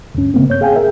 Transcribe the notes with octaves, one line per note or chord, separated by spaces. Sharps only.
D2 G2 C#4
C#3 A#3 C4
G2 C#5 G6
G#4 F5 G5 G#5
G#4 A#4 E5